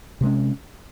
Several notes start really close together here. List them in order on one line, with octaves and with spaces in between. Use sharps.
C3 G#3 C#4